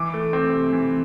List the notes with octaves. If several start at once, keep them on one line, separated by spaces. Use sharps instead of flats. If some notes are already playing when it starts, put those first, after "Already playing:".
Already playing: E3 D6
A3
C4
C3
E3